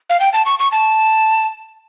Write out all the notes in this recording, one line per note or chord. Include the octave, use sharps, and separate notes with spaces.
F5
G5
A5
C#6
C#6
A5